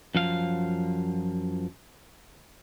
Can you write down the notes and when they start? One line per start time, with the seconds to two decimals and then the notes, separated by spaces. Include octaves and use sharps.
0.15 F#2 F3 F5